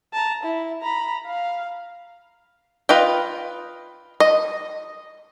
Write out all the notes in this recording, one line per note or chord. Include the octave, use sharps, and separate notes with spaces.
A5 A#5
E4
A#5 B5
F5
F4 B4 D#5 G5
D#5